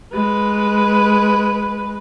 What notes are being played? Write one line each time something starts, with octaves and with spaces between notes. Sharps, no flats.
G#3 B4